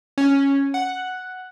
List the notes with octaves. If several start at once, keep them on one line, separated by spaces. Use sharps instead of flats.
C#4
F#5